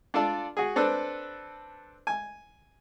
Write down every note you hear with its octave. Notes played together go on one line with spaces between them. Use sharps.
D4 F4 A4 D5 A5
F#4 G#4
C4 D4 A4 B4
G#5